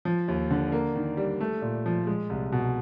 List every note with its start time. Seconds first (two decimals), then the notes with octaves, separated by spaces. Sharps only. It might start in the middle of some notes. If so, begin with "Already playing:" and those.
0.05 F3
0.28 D#2
0.51 D3
0.72 A#3
0.96 D#3
1.17 G3
1.41 A3
1.62 A#2
1.86 F3
2.07 G#3
2.30 C2
2.52 B2